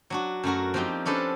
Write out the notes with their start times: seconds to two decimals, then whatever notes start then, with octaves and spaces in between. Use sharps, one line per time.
0.10 F#3 D4 F#4
0.44 F#2 A3 F#4 A#4
0.74 F3 A#3 C4 D#4 G4
1.05 C#4 D4 A4 B4 C5